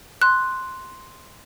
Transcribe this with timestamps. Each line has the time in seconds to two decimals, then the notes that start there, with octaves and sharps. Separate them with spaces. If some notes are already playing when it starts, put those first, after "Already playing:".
0.22 C6 F#6